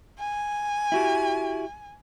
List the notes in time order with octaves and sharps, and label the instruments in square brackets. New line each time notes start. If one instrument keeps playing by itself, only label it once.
[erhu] G#5
[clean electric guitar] E4 F#4 G4